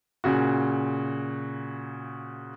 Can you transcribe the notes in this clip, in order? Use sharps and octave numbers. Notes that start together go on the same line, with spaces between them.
A#2 C#3 F#4